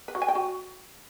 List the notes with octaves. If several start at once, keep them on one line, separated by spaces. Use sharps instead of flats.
B4
F#4
G#5
G5
F#4